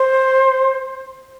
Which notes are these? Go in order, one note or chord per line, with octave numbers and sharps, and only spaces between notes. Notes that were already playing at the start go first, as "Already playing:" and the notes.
Already playing: C5